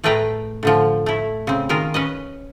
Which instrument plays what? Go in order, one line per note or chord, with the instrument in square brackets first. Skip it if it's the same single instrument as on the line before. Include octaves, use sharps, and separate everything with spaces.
[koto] A2 A3 G#4 B4 G5 A#5
A2 D3 F3
A3 E4
C#3 C4
D#3 G#3 F4 A#4
C#4 B4 D#5